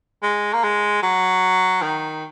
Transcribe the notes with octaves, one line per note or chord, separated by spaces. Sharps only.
G#3
A#3
G#3
F#3
D#3